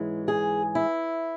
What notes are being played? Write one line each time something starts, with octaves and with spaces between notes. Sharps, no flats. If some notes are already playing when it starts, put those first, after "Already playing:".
Already playing: G#2 E3 G#3 C#4
G#4
E4